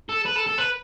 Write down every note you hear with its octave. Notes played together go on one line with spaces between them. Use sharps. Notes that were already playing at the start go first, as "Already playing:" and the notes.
A4
B4
A4
A4
B4